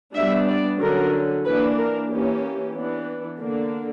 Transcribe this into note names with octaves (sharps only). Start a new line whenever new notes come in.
G3 B3 D4 E5
D5
D3 F#3 C#4 A#4
E3 A#3 D4 B4
A#4
E3 A#3 C#4 G4
E3 B3 D4
D3 A#3 D4